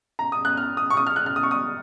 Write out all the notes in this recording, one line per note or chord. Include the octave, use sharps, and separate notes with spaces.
A#5
D#6
F#6
F6
D#6
C#6
D#6
F6
F#6
F6
D#6
C#6
D#6